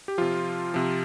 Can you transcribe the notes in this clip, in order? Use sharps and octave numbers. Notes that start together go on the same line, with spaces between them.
G4
C3 F3 F4
C3 F3